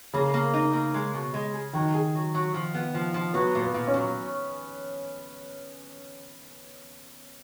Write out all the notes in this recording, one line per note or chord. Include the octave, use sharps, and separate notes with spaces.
C#3 A#3
A#3
D#4
A#3
G#3
B2
G#3
G#4
D#3 F#3
G#4
F#3
F#3
F3
B3
F3
F3
F#3 B3
A#2
B3
A#2
C#4
F#3